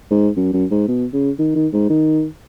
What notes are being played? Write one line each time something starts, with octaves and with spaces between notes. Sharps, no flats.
G#2
F#2
F#2
G#2
B2
C#3
D#3
D#3
G#2
D#3